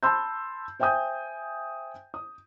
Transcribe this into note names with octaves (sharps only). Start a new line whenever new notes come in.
A5 B5 C6 E6 G6
C5 E5 G5 G#5 D#6 G6
D#6